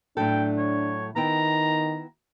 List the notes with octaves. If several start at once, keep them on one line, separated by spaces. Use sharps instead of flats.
A2 F#3 D4 A4 G5
C#5
D#3 B3 E4 G5 A#5